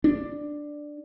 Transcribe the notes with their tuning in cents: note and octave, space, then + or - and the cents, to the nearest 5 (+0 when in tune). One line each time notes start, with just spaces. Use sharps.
D4 +5